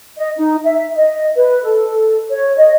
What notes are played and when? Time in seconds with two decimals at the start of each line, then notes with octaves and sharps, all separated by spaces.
0.18 D#5
0.37 D#4
0.65 E5
0.97 D#5
1.36 B4
1.63 A4
2.30 C#5
2.57 D#5